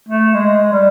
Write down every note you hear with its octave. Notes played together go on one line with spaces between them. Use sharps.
A3
G#3
G3